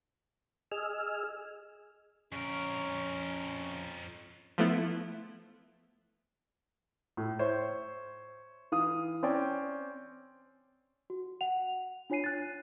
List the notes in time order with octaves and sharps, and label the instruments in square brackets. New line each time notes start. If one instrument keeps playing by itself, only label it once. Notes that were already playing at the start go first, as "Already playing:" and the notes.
[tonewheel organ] G#4 D#5 G#5 E6 F6
[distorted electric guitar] F2 A#4 [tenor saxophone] C#4
[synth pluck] F3 A3 B3 E4
[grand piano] A2
C5 C#5 E5
E3 F5 D#6
C4 C#4 D5 G5
[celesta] F#4
F#5 F7
D4 F4 C#5 G#5 C7 D#7
F#6 A6